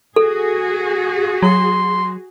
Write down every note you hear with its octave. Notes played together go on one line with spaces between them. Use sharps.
F#4 G#4 A4
F#3 C6